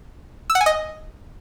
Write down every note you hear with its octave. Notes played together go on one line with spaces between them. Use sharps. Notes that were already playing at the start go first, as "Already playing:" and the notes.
E6
F#5
G#5
D#5